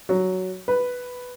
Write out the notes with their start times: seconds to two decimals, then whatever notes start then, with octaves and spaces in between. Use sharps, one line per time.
0.09 F#3
0.68 B4